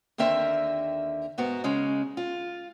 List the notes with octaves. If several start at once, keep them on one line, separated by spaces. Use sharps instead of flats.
D#2 D3 C4 A#4 E5
G#2 B3 F#4 A#4
C#3 G#3 C#4
F4